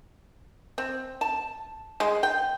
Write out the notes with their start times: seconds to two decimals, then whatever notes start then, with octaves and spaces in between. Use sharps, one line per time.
0.78 C4
1.21 A5
2.00 G#3
2.23 G5